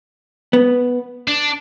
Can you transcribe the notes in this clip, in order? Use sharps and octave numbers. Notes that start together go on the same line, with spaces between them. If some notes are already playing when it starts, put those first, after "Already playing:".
B3
D4